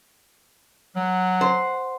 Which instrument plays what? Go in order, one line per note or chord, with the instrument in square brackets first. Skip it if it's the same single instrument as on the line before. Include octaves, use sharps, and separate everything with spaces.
[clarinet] F#3 [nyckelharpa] F#5
[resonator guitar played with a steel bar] C5